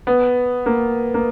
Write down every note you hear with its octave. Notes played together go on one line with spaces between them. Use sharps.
B3
A#3
A#3